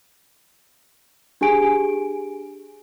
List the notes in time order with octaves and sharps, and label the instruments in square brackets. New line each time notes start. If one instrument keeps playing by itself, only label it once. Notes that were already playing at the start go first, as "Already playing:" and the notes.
[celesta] D4 G4 G#4 G#5 D7